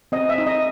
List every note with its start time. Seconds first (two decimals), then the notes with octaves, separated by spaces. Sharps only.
0.12 C4 D#5
0.29 E5
0.38 D#4
0.46 D#5